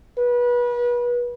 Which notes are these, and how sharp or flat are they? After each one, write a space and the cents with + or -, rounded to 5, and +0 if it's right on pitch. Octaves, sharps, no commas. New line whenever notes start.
B4 -30